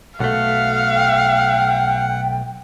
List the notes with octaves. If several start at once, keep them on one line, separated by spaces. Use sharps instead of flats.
B1 A3 F5 F#5
G5